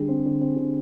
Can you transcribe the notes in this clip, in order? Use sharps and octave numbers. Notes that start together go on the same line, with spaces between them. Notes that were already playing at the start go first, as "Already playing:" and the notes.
Already playing: D3 G3 G#4
C4
D3
C4
D3